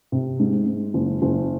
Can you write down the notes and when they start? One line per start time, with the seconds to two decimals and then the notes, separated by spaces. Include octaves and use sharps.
0.12 C3
0.40 G#2
0.67 G#2
0.94 F#1
1.22 F#1